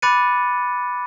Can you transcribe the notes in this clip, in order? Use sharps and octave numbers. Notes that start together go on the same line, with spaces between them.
B5 D6 F#6 A6 C#7 D#7